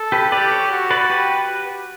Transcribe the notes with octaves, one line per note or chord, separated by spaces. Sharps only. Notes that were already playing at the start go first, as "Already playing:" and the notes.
Already playing: A4
G4 B4
G4 B4 D5
A4 C#5
F#4
B4 D5
G4 B4